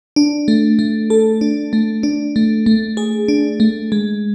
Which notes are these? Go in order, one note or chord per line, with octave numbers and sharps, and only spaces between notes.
D4
A3
A3
A4
D4
A3
D4
A3
A3
G#4
D4
A3
G#3